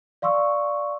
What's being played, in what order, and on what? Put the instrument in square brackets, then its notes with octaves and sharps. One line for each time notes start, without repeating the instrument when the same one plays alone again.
[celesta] D5 F5 C6 C#6 E6